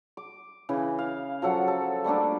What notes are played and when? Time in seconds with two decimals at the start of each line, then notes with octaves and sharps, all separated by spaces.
0.17 D6
0.69 C#3 E3
0.99 F5
1.42 F3 F#3 A4 F#5
1.68 A4
2.04 G3 A3 A#3 D4